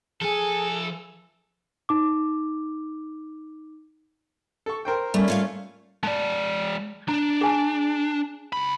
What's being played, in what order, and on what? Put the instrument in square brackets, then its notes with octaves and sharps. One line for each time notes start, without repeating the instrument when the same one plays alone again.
[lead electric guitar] F3 G#5 [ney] G#4 [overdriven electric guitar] A4
[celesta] D#4 D6
[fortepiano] A4 C#6
A#4 C5 G5
[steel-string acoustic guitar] G3 [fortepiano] A3 A#3 C#4
[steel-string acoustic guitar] F4 C#5 F5
[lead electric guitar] G#3 D5 [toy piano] A5
[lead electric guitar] D4 [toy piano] A#5
[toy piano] G#4 G#5 A5
[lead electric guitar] C#2 B5